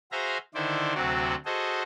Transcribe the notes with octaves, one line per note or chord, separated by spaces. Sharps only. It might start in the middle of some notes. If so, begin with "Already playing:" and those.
F#4 G#4 C5 E5 F5 A#5
D3 D#3 E4 C5 D5
D2 C3 F#3 C4 F#4 D5
F#4 G#4 A4 C5 D#5